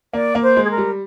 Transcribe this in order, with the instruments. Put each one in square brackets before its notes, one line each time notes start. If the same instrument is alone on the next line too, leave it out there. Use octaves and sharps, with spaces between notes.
[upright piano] A#3 [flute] D5
[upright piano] A#3
[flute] C5
[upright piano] G#3
[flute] G#4
A#4
[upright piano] G3